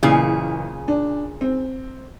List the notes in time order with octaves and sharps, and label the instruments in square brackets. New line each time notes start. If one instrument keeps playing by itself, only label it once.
[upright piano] F#1 E3 [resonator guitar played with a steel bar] A#2 C#3 G#4
[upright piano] D4
C4